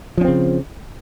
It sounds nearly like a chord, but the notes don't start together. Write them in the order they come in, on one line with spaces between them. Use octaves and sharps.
F3 C#4 C4 C#3